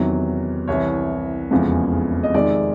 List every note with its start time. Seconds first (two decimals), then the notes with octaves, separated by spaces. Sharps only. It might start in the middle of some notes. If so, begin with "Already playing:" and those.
Already playing: E2 C3 D#3 F#3
0.68 C2 C3 E3 C#5
1.51 F1 E2 C#3 F3 G#3
2.23 D#5
2.34 F2 C3 D#3 G#3 D5